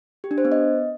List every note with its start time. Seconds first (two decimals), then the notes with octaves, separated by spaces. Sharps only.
0.24 G4
0.31 D4
0.38 C5
0.45 B3
0.52 D#5